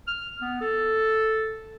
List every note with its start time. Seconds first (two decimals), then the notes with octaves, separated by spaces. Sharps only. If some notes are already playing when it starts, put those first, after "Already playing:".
0.08 F6
0.41 B3
0.61 A4